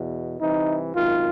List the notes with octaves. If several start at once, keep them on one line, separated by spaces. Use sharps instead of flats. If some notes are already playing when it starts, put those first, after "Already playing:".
Already playing: E2 B2
C2 C3 E3 D#4
G#1 F#2 D#3 F4